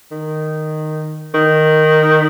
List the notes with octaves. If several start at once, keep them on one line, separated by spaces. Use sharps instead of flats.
D#3
D#3